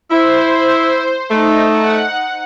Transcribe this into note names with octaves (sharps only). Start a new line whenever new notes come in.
E4 C5
A3 D#4
F#5